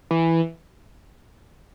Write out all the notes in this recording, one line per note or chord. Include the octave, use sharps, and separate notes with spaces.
E3